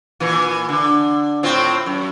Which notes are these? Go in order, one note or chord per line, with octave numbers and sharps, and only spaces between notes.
A#2 E3
D3
A2 C4 F4
F#2